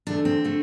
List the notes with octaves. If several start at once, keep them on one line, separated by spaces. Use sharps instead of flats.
E2 D3 A3 D4
C4
D3 A3